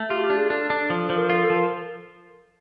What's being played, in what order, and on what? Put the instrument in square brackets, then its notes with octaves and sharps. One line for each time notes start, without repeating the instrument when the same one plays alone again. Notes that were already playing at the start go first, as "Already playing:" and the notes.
Already playing: [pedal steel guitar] A3
[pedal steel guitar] F4 [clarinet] G4
[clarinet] F#4
G4
[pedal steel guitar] D4
[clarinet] G#4
[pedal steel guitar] D4 [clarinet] A4
[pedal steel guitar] D4
F3
F3
[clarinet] A#4
[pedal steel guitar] F4 [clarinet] A4
[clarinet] A4
[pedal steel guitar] F3
[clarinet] A#4